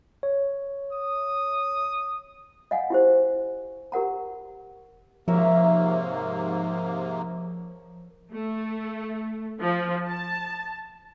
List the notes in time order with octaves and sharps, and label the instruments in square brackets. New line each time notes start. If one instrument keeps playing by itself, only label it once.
[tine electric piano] C#5
[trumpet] D#6
[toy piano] D#5 F5 F#5 G#5
E4 G4 C5
G4 A#4 F#5 A#5
[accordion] G#2 C3 A#3 [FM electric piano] F3 [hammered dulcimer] A#4 C#5 E5
[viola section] A3
F3
A5